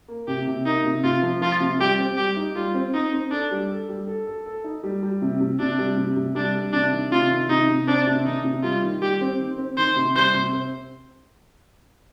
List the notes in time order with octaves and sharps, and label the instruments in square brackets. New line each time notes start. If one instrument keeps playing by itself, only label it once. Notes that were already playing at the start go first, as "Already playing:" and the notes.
[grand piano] A#3
[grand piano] C3 [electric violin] G4
[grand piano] C3
[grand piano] A#3 [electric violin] D#4
[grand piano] C3
[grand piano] C3 [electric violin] F4
[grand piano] F3
[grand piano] F3 [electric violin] F4
[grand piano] C3
[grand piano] G3 [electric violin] G4
[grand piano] C4
[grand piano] G3 [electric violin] G4
[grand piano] D#4
[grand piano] G3 [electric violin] F4
[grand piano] C4
[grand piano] C4 [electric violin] D#4
[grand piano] C4
[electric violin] D4 [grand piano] A4
[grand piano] G3
A4
G3
A4
A4
A4
D#4
G3
G3
C3
C3
[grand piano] C3 [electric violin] D4
[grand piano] G3
C3
C3
[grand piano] G3 [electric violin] D4
[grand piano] G3
[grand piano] C3 [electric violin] D4
[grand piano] D#3
[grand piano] C3 [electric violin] F4
[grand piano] D#3
[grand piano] C3 [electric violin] D#4
[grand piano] C3
[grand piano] C4 [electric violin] D4
[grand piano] C3
[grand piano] D#3 [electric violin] D#4
[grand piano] C3
[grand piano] G3 [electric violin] F4
[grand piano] D#3
[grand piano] G3 [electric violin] G4
[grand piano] C4
D#3
C4
[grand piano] D#3 [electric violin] C5
[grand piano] C3
[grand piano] G3 [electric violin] C5
[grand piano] C3
C4